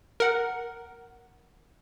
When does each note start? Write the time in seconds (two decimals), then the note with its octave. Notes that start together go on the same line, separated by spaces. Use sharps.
0.20 A#4 F#5